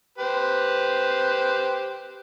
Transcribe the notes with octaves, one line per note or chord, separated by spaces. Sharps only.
G4 B4 C5